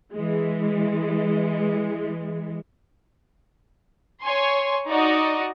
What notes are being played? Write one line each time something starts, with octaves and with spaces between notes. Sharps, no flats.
E3 G#3
C#5 G#5 C6
D#4 F#4 D5 D#5